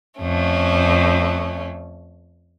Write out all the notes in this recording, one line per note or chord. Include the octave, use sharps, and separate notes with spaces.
F2 A3 C#4